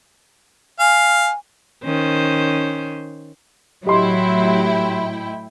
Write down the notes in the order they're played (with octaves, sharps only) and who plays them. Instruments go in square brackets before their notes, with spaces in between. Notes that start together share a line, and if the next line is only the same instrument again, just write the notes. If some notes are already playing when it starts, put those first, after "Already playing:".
[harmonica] F5 [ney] G#5
[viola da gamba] D#3 C#4 C5
[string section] A2 E4 G5 [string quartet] F#3 [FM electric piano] G4 [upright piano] D#5 C6